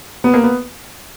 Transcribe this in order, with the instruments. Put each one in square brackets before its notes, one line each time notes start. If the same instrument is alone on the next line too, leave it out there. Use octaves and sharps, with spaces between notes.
[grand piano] B3
A#3
B3